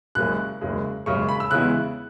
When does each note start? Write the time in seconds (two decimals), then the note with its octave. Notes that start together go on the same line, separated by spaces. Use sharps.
0.15 F#1 F#2 C#3 G#3 F#6
0.61 F#1 F#2 C#3 G#3
1.06 F#1 F#2 C#3 G#3 C#6
1.29 B5
1.40 E6
1.51 E2 C#3 G#3 B3 E4 F#6